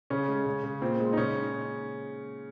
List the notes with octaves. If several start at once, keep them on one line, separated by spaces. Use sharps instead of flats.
C#3 C#4
G#3
C#3
C#3
A#2 C4
G#3
D#4
C#3 C#4